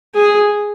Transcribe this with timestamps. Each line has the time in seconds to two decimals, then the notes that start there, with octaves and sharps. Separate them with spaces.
0.15 G#4